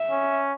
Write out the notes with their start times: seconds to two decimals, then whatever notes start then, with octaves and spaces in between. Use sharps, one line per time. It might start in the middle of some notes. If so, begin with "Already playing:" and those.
Already playing: E5
0.11 C#4